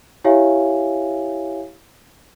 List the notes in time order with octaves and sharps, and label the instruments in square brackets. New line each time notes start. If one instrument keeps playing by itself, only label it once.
[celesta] E4 G4 C#5 E5 F5 G#5